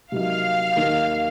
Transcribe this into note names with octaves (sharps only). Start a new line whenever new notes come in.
C3 F#3 A#3 D#4 F5
D#2 D#3 A#3 D#4